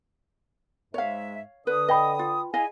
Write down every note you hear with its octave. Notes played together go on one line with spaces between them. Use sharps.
G#2 G#3 C#5 E5 F5
D3 B4 D#6
B4 D#5 G5 B5
F4
E4 G#4 D#5 F5 G#5